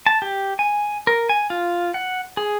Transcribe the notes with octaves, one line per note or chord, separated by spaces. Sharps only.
A5
G4
G#5
A#4
G#5
F4
F#5
G#4